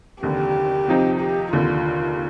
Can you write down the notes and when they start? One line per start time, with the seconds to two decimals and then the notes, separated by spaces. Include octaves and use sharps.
0.23 F1 D#2 D3 G4
0.88 F2 C3 F3 C4 D#4
1.20 G4
1.53 F1 D#2 D3 F4